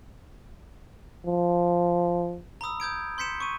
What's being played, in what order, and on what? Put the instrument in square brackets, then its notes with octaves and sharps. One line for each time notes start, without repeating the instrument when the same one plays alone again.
[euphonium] F3
[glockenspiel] A#5 B5 D#6 E6
D#6 G6 G#6 D7
C6 G6 B6 C#7 E7
C#6 D#7